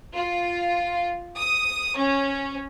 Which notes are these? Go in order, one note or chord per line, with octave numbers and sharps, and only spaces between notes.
F4
D#6
C#4